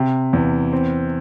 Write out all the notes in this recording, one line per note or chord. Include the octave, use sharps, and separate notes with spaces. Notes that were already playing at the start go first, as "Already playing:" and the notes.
Already playing: C3
E2
C4